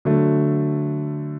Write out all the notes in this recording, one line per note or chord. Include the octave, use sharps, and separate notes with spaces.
D3 F#3 A3